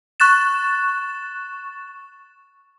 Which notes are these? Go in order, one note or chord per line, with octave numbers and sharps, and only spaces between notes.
C#6 F#6 A6 E7